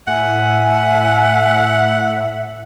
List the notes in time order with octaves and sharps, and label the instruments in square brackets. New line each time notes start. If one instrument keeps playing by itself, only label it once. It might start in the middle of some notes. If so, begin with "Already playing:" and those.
[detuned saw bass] A2 [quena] E5 [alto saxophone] F#5 [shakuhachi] G#5